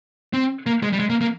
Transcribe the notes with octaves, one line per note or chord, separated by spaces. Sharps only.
C4
A#3
G#3
G3
G#3
A#3
A#3